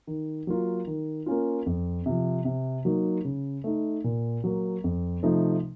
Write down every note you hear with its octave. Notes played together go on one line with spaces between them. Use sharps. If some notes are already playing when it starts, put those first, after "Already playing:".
D#3
F#3 A#3 F4
D#3
A#3 C#4 F4
F2
C3 F3
C3
F#3 A#3 D#4
C#3
A3 D#4
A#2
F#3 A#3
F2
C3 F3 A3 D#4